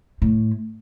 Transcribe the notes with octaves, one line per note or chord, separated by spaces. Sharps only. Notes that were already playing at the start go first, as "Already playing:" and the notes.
A2